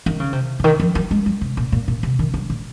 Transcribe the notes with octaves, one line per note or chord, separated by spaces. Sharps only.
D#3
C#3
C3
C#3
D#3
F3
F#3
G#3
F#3
C3
A#2
A#2
A#2
C3
D#3
F#3
A#2